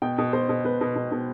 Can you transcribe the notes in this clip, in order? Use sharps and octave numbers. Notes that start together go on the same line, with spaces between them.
B2 G5
B2
B2 C5
B2
B2 B4
B2
B2
B2